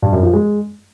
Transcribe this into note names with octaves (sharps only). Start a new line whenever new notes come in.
G2
F#2
F3
G#3